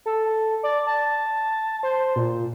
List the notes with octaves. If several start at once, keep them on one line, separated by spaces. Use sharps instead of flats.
A4
D5
A5
C5
A#2